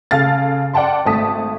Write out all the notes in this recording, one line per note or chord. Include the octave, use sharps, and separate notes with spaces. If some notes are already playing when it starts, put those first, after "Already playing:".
C#3 A4 F5 F6 A6
D5 F#5 G5 A5 C6
G#1 A3 A5 D#6 B6